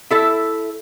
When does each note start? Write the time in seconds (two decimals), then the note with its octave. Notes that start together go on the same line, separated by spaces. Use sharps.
0.10 E4 A4 E5